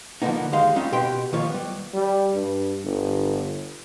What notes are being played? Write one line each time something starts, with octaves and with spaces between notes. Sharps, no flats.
D3 F3 G#3 A#3 B3 D#4
D#2 G3 G#3 D#4 F5 C6
G3 A#3 C4 C#4 D#4 F4
B2 G4 B4 G5 C6
D#3 F3 A#3 F4 C#5
G3 B3
G3
G2
G1